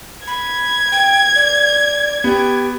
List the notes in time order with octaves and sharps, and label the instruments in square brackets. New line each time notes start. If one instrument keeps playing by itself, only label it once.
[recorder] B5 [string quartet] G#6
[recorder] G5
D5
[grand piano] B3 [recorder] G4